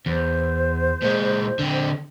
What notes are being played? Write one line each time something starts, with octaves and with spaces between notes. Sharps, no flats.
E2 C5
A#2 G#3
D3 C4